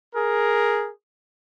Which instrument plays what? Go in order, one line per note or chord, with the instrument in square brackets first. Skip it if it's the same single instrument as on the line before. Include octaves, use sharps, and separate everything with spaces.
[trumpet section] G#4 A#4